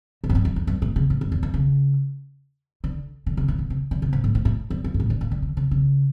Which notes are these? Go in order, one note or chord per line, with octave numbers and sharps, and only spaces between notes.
A#2
F2
G2
F2
E2
G2
A2
C#3
A2
G2
E2
F2
C#3
D3
D3
C#3
A#2
A#2
C#3
D3
C#3
A#2
A2
A2
A2
E2
F2
G2
A2
D3
A#2
D3
D3
C#3
C#3